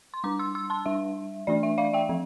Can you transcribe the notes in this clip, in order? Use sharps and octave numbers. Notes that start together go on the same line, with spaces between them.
C6
G3 D4 A#5 D6
C6 E6
C6 E6
A5 C6
G3 D4 E5
E3 A3 D4 D5
E5
D5 F5
E5 G5
F3 C4